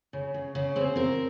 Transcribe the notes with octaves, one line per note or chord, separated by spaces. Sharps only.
C#3
C#3
C#3
C4 G#4
C4 A#4